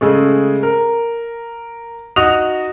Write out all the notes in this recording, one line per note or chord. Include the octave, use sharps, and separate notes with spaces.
C#3 G#3 A3
A#4
D#4 F#4 D#6 F7